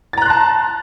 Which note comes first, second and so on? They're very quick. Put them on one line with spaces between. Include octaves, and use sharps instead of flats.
A6 A#5 F#6 C6 A5